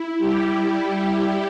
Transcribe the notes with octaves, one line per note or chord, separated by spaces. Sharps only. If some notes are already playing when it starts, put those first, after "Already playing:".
Already playing: E4
G3 G4